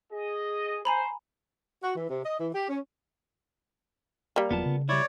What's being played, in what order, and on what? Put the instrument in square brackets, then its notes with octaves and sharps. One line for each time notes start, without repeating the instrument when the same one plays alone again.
[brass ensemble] G#4 D#5
[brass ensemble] C5 [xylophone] G#5 A#5 B5
[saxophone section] F#4
E3
C3
D#5
E3
G4
C#4
[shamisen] G3 A#3
[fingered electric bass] E1 F#3 [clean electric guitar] B3 F4 A5
[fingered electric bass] C#3
[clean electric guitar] G3 E4 [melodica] C#5 D5